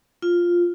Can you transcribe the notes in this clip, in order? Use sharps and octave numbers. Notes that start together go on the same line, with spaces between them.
F4